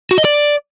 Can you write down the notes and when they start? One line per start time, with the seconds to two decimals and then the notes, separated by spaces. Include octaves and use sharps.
0.11 F#4
0.18 D#5
0.25 D5